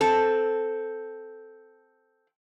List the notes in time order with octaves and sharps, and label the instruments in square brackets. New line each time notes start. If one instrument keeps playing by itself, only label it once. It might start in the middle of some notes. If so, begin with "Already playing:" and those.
[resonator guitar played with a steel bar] C4 A4